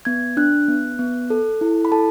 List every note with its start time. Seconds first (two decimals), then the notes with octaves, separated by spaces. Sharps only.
0.05 B3 G#6
0.37 D4 F#6
0.68 B3
0.99 B3
1.30 A4
1.61 E4
1.85 B5
1.92 A4 A5